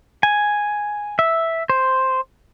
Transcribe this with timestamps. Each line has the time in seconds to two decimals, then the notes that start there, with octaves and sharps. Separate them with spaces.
0.23 G#5
1.19 E5
1.70 C5